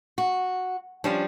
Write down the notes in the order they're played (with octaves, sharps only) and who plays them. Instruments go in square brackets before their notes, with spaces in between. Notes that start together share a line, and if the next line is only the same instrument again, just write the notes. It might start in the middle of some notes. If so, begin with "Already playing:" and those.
[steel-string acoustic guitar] F#4
[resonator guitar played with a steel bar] F3 G3 D4 [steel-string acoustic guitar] C#4